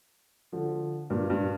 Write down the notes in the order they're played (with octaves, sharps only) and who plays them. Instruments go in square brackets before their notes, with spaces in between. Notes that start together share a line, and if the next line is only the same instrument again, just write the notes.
[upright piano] D3 F3
G2 A#2
G2